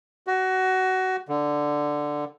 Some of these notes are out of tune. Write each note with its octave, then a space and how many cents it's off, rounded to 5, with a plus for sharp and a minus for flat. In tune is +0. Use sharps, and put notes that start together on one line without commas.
F#4 +20
D3 +5